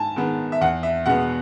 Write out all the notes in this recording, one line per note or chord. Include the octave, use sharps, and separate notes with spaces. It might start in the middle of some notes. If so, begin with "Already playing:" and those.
Already playing: G#2 G#5 A5
D#3 G#3 B3
E5
E2 F#5
E5
B2 G#3 B3 F#5